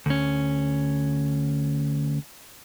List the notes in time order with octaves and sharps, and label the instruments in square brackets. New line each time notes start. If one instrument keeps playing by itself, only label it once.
[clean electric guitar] D2 C#4